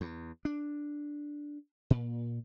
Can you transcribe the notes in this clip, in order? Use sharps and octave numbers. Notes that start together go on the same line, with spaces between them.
E2
D4
A#2